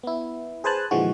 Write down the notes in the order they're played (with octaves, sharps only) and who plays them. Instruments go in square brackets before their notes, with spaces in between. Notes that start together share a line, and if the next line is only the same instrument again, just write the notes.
[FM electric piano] B3 E4
G#4 B4 C5 G#5 A5 F#6
A#2 D3 E3 F3 G#3 F#4